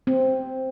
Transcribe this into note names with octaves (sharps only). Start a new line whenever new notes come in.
C4